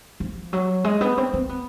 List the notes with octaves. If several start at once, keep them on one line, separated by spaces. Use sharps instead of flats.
F3
F#3
G#3
B3
C4
C4
B3